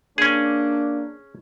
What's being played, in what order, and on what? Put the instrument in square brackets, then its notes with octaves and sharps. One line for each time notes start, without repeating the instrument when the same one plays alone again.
[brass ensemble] A#3 D4 [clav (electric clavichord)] C#4 G#4